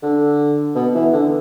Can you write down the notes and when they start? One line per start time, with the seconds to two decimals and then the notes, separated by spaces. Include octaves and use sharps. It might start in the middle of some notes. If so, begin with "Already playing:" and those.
0.03 D3
0.75 B2
0.94 E3
1.13 D3